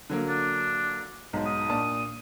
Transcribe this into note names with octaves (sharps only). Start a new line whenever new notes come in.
D3 F#3 A#3
D4
B1 G#2
D#6
A#2 D4 A5